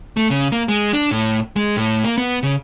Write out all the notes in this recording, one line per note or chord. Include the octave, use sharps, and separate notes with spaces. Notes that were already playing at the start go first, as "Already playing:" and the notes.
A3
C#3
A#3
G#3
D4
A2
G#3
A2
A#3
B3
C#3